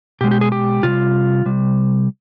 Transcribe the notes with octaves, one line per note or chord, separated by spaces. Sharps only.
B2 G#3 G4
G4
G#4
G4
C3 G3 F4
C3 G3